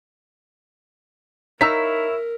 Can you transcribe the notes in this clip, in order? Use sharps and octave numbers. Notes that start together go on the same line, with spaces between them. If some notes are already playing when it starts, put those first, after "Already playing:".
D#4 E4 A#4 C#5 F5 A#5 E6 B6